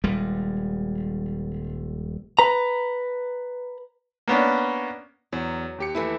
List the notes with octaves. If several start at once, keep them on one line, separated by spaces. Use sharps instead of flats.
D#1 G3 G#3
B4 A#5
A#3 B3 C#4 D4
E2 F#3
D#2 G4 C#7
E3 A3 E4